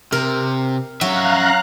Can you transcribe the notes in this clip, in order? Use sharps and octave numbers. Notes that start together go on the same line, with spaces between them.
C3 A#4
F#3 C#4 E5 F5 A#5 F#6